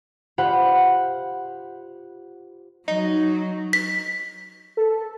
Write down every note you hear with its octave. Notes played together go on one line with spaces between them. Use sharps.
F4 G4 C5 F#5 B5
F#3 D#4
B6
A4